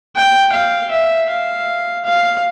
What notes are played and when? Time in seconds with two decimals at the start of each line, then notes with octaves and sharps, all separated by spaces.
0.16 G5
0.53 F5
0.91 E5
1.30 F5
2.05 F5